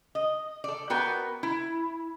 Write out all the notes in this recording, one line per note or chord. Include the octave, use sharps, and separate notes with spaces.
D#5
A4 D5
B3 F#4 A#4 B4 G5
E4